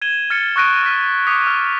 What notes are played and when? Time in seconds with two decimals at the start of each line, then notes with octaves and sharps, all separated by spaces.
0.02 G#6 D#7 E7 G7
0.30 F6 A6 C#7
0.56 C#6 D#6 F#6 A#6 D7 D#7
0.83 F6 B6
1.27 D6 D#6 G6 B6 C#7
1.47 F6